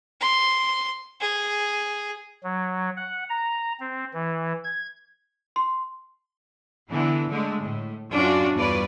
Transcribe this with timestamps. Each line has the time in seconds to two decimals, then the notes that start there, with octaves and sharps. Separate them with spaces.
0.20 C6
1.20 G#4
2.43 F#3
2.97 F#5
3.29 A#5
3.80 C4
4.14 E3
4.64 G#6
5.56 C6
6.90 D3 E3 B3
7.31 D3 G#3 A3
7.62 A2
8.12 F#2 C#4 D4 F4 F#4 D5
8.55 E2 G2 F4 B4 C#5 D5